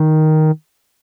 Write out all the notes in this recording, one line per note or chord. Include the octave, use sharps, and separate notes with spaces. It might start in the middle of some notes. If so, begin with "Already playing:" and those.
Already playing: D#3